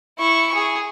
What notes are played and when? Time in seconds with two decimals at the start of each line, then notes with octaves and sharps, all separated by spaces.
0.19 E4 C#6
0.55 G#4